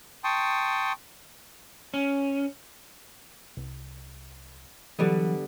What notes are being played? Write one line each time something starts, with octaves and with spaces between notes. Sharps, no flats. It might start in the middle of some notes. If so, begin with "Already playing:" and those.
G5 A5 C6 C#6 D#6
C#4
C2
D3 E3 F#3 G3 B3